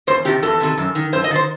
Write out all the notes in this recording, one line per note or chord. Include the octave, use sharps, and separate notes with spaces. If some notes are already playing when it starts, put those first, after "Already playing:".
E2 C5
C3 D#3 G4
E2 A4
C3 D#3
F#2
D#3
F#2 C5
D#5
D#3 C5